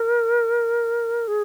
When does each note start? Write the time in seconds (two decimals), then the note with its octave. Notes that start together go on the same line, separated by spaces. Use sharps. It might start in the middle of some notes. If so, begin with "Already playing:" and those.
Already playing: A#4
1.28 G#4